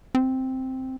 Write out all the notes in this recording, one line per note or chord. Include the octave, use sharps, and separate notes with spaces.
C4